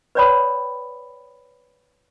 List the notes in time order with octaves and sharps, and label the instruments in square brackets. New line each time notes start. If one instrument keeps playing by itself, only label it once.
[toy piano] B4 C#5 D5 G5 B5 D#6